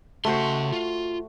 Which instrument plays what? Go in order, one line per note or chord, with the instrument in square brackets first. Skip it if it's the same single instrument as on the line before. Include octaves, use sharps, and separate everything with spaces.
[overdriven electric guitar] C#3 C6 [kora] A3 F#4 C5
[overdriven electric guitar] F4